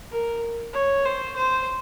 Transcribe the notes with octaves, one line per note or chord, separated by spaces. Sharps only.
A#4
C#5
C5
C5